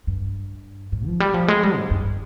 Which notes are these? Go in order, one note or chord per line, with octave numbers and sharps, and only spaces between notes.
G2
G#2
F3
G3
F3
G#3
G3
G#2
G2